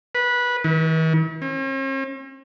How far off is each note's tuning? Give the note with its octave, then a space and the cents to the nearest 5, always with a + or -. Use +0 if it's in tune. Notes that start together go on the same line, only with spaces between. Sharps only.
B4 -15
E3 -45
C#4 -45